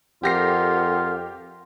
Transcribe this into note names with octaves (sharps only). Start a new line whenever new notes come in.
F2 F4 G4 A4 A#4 F#5 A#6 C7